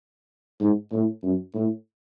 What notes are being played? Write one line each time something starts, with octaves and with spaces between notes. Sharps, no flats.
G#2
A2
F#2
A2